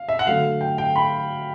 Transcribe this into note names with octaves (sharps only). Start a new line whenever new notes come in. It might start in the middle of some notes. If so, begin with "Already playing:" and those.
Already playing: F5
E5
F#5
D3 F#3 A3 F5
G5
G5
B5